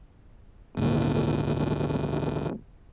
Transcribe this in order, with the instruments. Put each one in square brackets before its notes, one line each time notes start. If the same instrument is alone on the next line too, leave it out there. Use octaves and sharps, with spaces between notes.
[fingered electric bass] G#1 D2 A#2